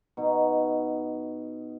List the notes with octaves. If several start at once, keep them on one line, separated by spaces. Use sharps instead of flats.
B2 D#4